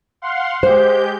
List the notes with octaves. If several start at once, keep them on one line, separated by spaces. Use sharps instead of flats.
F5 F#5 C6
G#3 G4 C5 G6